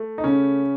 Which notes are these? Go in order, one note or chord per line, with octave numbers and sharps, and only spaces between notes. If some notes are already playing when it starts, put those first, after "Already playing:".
Already playing: A3
D#4
C#3 C#4